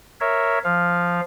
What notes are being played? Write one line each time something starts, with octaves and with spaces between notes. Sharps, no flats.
A#4 C#5 E5
F3 F5